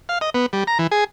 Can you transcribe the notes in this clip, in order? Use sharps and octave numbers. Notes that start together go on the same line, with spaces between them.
F5
D#5
B3
G3
A#5
E3
G#4